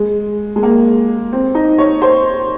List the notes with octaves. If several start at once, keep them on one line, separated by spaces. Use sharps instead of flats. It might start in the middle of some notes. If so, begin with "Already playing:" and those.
Already playing: G#3
G#3
A#3
C4
D#4
C#5
C5